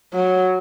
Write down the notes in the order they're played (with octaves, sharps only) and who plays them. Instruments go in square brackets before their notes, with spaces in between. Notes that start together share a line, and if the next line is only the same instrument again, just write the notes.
[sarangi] F#3